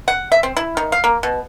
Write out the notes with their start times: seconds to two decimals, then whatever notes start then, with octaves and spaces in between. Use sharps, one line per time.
0.08 F#5
0.32 E5
0.43 C4
0.57 E4
0.77 D#3
0.92 F5
1.04 A#3
1.23 B2